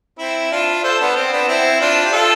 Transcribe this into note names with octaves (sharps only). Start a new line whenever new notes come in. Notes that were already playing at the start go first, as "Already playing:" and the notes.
C4 E4
D4 F4
A4 C5
B3 D4
C4
B3 D4
C4 E4
D4 F4
G4
F4 A4